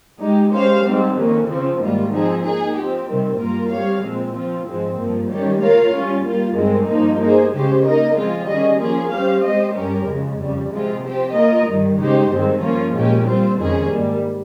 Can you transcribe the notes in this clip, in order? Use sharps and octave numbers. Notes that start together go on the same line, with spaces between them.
G#3 D#4 G4
G#3 C#4 G4 C5 F5
G#2 G3 C4 G4
F2 D#3 A#3 C#4
C#3 F3 C4
G#2 D#3 G3 A#3 F4
F3 C4 D#4 G#4
A#3 D#4 G#4
F3 C4 G4
C3 D#3 G3 C4
G2 G3 A#3 F4 A#4
G3 C4 G4 C#5 F5
A#2 F3 G#3 C4
F3 C4 F4
G#2 F3 G#3 C4
G2 F3 A#3
D#3 G3 C#4 G4 C#5
A#3 F4 A#4 C#5 F5
G3 C#4 F4
G3 A#3 F4
G2 D#3 G#3 C4
G2 F3 A#3 D#4
A#3 D#4 G#4 C5
C#3 G#3 C#4 G4 C5
A#3 D#4 A#4 D#5
F3 G#3 C4 F4 G#4
D#3 G3 C#4 G#4 D#5
F3 A#3 C#4 F4 G#4
G3 C#4 G4 C5 F5
G#3 C4 G4 C5 D#5
G2 G3 C#4 G4 A#4
F2 C#3 G#3
F2 C#3 G3
C3 F3 G#3 C4 F4
F3 C4 G4 C5
A#3 F4 A#4 D#5
G2 D#3 G3
C#3 G#3 D#4 G4 C5
G2 D#3 G#3 C4
F3 A#3 C#4 F4
A#2 G#3 C#4 G4
G3 C4 F4 C5
F2 D#3 G#3 C#4 G#4
G#2 G3 A#3